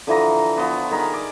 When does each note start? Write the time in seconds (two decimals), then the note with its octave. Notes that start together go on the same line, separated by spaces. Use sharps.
0.07 D3 E3 F3 A#5
0.57 F3 B3
0.91 D#3 G#4 A#4 B5
1.13 D5